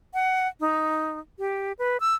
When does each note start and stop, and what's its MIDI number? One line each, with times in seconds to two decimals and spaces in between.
0.14 0.48 78
0.60 1.19 63
1.39 1.73 67
1.79 1.97 71
2.00 2.15 88